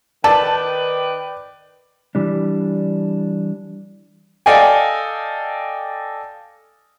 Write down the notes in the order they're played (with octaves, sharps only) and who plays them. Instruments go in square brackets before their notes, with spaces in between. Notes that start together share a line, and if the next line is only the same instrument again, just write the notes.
[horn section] D#3 B4 G5 [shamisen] A4 [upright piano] D5 [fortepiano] A5
[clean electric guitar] E3 G3 D4
[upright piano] A4 D5 D#5 F5 G5 G#5